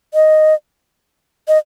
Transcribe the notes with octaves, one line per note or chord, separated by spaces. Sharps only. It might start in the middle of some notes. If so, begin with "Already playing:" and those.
D#5
D#5